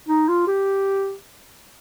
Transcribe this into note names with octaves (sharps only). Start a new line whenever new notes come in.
D#4
F4
G4